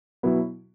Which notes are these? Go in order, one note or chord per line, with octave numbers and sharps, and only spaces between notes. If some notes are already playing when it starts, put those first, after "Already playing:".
B2 F#3 B3 E4